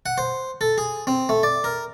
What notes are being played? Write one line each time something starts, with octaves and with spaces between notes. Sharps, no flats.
F#5
C5
A4
G#4
C4
A3
D5
A#4